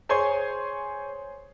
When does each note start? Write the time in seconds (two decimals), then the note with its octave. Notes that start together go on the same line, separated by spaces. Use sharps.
0.09 G#4 C5 C#5 G#5 C6 C#6